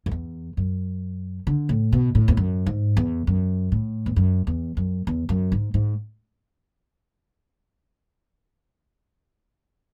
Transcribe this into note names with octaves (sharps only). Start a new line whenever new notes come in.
F#2
E2
F#2
D3
A2
B2
A2
E2
F#2
G#2
E2
F#2
A2
E2
F#2
E2
F#2
E2
F#2
G#2
G#2